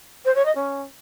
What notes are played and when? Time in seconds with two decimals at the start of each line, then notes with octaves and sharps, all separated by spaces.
0.25 C5
0.35 C#5
0.45 D#5
0.55 C#4